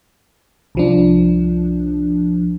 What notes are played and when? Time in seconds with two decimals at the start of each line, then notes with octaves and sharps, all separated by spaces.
0.75 C2 F3 D4